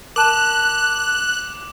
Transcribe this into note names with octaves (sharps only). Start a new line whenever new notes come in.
A#4 A5 D6 F#6 E7